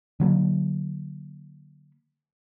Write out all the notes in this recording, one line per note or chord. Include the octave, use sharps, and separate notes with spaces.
D3 F#3 A#3